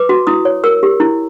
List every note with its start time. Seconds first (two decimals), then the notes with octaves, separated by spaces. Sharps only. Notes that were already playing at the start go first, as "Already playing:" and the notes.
Already playing: B4 D6
0.09 F#4
0.27 E4 D#6
0.45 C#5
0.64 A#4 E6
0.83 G4
1.00 E4